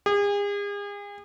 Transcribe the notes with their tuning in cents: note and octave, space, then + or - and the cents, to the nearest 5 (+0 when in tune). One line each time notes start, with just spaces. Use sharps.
G#4 -40